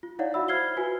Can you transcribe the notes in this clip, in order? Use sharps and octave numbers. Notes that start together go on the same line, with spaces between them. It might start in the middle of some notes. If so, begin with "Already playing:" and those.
F4
D#4 E4 C#5 D5 F5 F#5
F#4 E5 B5 E6
C5 F6 G#6 C7 G7
F4 F#4 B4 G#5